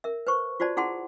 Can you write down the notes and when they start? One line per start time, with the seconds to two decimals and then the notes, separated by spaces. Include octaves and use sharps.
0.04 A#4 E5
0.27 B4 C5 C#6
0.60 F4 F#4 C5 D5 A5
0.77 E4 G#4 F#5 A5 C6